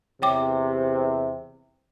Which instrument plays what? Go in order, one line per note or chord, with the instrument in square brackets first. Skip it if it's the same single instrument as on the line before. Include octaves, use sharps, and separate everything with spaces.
[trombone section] E2 C3 [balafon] C#5 G5 D6